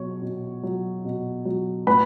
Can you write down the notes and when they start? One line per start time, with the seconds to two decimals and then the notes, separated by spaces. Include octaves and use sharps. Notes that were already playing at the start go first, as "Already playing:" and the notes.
Already playing: B2 F#3 C#5 C#6
0.22 B2
0.63 F#3
1.05 B2
1.45 F#3
1.87 A2 B4 B5